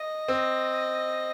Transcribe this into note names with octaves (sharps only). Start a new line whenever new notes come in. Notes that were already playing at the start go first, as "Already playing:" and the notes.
Already playing: D#5
C4